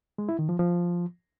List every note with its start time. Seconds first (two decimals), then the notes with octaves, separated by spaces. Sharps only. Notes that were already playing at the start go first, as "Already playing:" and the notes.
0.18 G#3
0.29 E4
0.39 D#3
0.49 F3
0.59 F3